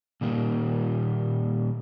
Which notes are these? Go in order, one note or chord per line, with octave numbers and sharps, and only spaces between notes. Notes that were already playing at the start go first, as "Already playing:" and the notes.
A#2 D#3 G3 A#3